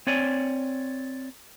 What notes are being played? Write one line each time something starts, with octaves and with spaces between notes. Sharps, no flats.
C4 C#5 D5 G#5